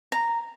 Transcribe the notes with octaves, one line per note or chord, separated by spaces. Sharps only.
A#5